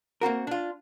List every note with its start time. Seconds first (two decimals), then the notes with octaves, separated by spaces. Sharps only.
0.21 A#3 C4 F#4 A#4
0.47 D4 F4